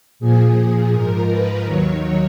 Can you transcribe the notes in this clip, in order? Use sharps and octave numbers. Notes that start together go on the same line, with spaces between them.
A#2 F3 G#4
G#2 F3 A#4
B4
D#2 D#3 F#3 C#5